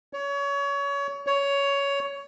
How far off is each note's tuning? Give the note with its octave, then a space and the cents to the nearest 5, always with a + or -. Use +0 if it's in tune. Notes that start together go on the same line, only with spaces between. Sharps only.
C#5 +25
C#5 +15